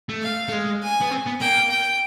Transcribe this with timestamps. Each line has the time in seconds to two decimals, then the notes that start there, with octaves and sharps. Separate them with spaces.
0.09 A3
0.23 F5
0.49 A3
0.52 G#3
0.83 G#5
1.01 B3
1.11 C4
1.27 B3
1.41 A#3 G5
1.71 G5